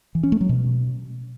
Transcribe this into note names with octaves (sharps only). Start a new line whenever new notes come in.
E3
C#4
A3
F#3
B2